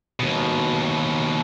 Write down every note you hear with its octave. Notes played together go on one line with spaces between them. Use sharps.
D#2 B2